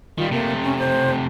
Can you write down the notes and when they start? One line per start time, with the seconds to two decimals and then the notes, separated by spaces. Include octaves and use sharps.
0.18 D#3 G3 F4
0.31 C3 A3 A#3
0.62 C#4
0.78 C5